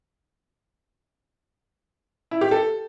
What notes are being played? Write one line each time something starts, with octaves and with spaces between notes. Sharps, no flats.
E4
G4
A4